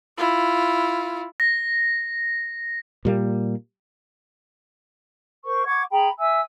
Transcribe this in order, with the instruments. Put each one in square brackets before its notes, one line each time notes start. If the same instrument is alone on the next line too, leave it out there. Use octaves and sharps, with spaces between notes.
[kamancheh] E4 F4
[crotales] A#6
[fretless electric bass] A#2 G3 A#3
[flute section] A#4 C5 C#6
F#5 C#6 D6 G#6
G#4 G5 A#5 B5
E5 G#5 E6